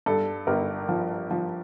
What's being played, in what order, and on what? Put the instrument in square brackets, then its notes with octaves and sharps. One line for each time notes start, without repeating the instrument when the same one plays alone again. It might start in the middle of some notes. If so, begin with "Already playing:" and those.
[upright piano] G2 A4
G1 A#4
F3
F3